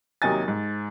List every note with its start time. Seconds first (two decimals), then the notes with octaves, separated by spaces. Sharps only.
0.22 D#2 C3 F#3 D#4 G#5 A6
0.48 G#2